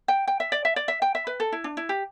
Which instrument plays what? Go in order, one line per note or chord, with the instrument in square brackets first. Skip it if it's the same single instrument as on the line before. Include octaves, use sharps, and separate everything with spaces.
[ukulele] G5
G5
E5
D5
E5
D5
E5
G5
E5
B4
A4
E4
D4
E4
G4